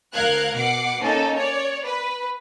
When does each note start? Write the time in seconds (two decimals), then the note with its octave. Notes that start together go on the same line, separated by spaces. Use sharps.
0.13 D2 A#4 F5 F#6 G#6
0.55 B2 F#5 D6 C7
1.02 A#3 C#4 D#4 A4
1.38 C#5 D5
1.85 B4